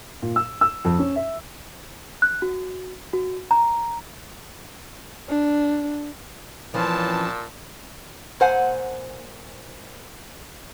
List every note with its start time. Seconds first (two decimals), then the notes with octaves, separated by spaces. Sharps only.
0.22 A#2
0.36 E6
0.61 E6
0.85 F2
0.99 C#4
1.16 E5
2.22 F#6
2.42 F#4
3.13 F#4
3.51 A#5
5.29 D4
6.74 A#2 E3 F3 C4 C#4 A5
8.40 A#2 C5 F#5 G#5